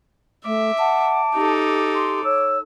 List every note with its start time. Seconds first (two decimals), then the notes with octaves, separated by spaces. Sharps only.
0.45 A3 E5 D6
0.79 F#5 A5
1.35 D#4 G4 A4
1.95 C6
2.24 C#5 E6